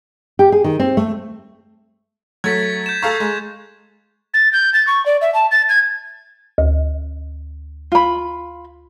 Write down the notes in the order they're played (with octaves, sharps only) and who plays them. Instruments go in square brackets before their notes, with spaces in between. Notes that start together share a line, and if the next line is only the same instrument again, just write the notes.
[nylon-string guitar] G4
G#4
D#3
C4
A3
[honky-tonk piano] F#3 A3 [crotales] G#6 A6 B6
[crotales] G6 E7
[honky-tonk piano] A4 F5 A#5 [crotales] C#6
[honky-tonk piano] G#3
[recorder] A6
G6
A6
C#6
D5
E5
A5
A6
G#6
[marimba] D2
[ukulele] F4 B5